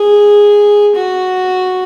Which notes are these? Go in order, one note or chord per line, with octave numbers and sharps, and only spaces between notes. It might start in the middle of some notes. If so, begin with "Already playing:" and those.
Already playing: G#4
F#4